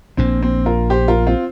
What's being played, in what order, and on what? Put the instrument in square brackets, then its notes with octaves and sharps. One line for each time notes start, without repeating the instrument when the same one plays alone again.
[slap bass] A#1 A#2 A#3 D4 [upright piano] C4
[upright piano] C4
F4 A#4
G4 C5
F4 A#4
C4 F4